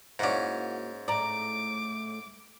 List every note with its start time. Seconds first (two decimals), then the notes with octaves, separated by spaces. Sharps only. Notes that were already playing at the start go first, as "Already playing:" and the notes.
0.19 G#2 A#3 C#4 E4 F#4 D5 F#5
1.08 A2 A3 D5 A#5 D6